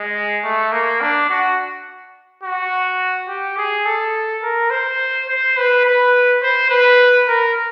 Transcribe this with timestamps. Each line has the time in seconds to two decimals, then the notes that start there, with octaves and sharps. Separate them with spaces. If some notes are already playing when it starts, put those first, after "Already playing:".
Already playing: G#3
0.44 A3
0.72 A#3
1.01 D4
1.30 F#4
2.43 F#4
3.28 G4
3.58 G#4
3.86 A4
4.43 A#4
4.71 C5
5.29 C5
5.57 B4
5.85 B4
6.43 C5
6.70 B4
7.27 A#4